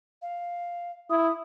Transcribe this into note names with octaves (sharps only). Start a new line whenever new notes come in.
F5
E4 D#6